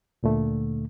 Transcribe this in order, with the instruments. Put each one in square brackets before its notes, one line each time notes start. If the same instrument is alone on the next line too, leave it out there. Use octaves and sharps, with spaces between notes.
[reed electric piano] D2 A#2 D3 A3